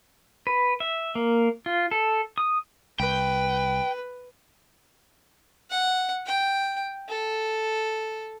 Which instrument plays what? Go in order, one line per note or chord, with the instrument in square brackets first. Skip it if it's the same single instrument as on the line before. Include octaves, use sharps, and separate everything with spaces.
[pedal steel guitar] B4
E5
A#3
F4
A4
D#6
[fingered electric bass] C2 [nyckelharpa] B4 [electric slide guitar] G5
[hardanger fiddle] F#5
G5
A4